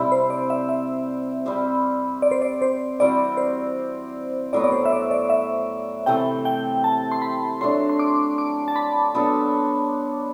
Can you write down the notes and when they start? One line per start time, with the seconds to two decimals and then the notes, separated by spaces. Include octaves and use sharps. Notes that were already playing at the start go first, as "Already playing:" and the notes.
Already playing: C3 G3 C4 E4
0.12 C5
0.30 D5
0.50 E5
0.69 E5
1.46 G3 C4 G4
2.22 D5
2.31 C5
2.42 D5
2.62 C5
3.00 E3 G3 C4 F#4 D5
3.37 C5
4.53 A2 F#3 B3 D5
4.64 D5
4.72 C5
4.85 E5
4.92 D5
5.11 D5
5.30 E5
6.06 C3 E3 A3 G5
6.45 G5
6.84 A5
7.11 C6
7.22 B5
7.61 F#3 A3 D4 C6
7.89 C6
7.99 D6
8.38 D6
8.68 A5
8.76 B5
9.14 F#3 B3 D4 A4